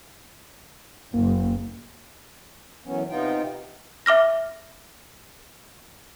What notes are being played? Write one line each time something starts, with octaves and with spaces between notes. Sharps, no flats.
F#1 A#3
F#2 E3 F#3 B3 C#4
C3 B3 D#4 F4 G5
E5 D6 F6 A#6